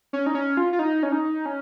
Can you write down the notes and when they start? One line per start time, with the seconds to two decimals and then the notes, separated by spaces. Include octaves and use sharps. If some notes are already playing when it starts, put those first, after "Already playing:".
0.13 C#4
0.26 D#4
0.35 C#4
0.57 F4
0.73 F4
0.79 D#4
1.03 C#4
1.12 D#4
1.46 C#4